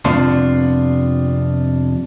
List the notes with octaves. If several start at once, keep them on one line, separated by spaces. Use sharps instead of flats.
F2 C3 B3 D4 F4